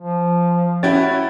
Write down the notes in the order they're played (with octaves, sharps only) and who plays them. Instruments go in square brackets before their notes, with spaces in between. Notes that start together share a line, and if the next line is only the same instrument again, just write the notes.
[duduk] F3
[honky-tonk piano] C#4 F#4 [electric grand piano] E4 G5 A6